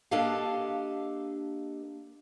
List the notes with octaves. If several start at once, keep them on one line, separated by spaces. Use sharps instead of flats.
A#3 D4 G4 A4 D#5 F5